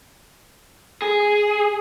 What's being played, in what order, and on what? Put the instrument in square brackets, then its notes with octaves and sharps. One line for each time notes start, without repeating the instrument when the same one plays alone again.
[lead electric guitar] G#4